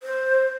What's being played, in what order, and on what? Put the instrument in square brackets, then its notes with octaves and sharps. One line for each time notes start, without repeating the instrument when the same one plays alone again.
[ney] C5